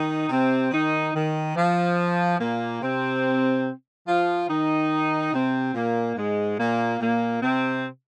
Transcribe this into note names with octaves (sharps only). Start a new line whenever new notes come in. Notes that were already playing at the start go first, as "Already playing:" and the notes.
Already playing: D#3 D#4
C3 C4
D#3 D#4
D#3
F3
A#2 A#3
C3 C4
F3 F4
D#3 D#4
C3 C4
A#2 A#3
G#2 G#3
A#2 A#3
A#2 A#3
C3 C4